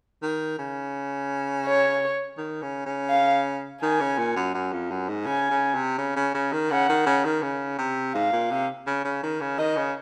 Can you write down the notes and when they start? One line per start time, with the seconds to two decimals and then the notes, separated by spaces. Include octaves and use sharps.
0.22 D#3
0.58 C#3
1.66 C#5
2.38 D#3
2.62 C#3
2.86 C#3
3.10 F5
3.82 D#3 G#5
4.00 C#3
4.18 A#2
4.36 F#2
4.54 F#2
4.73 F2
4.91 F#2
5.09 G#2
5.26 C#3 G#5
5.51 C#3
5.74 C3
5.98 C#3
6.16 C#3
6.34 C#3
6.52 D#3
6.71 C#3 F#5
6.89 D#3
7.06 C#3
7.25 D#3
7.42 C#3
7.78 C3
8.14 G#2 F5
8.32 A#2
8.51 C3
8.87 C#3
9.05 C#3
9.23 D#3
9.41 C#3
9.58 D#3 D#5
9.77 C#3